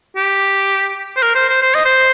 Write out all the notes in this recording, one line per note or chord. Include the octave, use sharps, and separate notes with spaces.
G4
C5
A#4
C5
C5
C5
D#5
C5